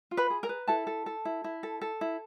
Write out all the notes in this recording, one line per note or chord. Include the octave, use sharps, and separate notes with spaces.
F4
B4 B5
G#4
A#4 A#5
B4
E4 A4 A5
A4
A4
E4
E4
A4
A4
E4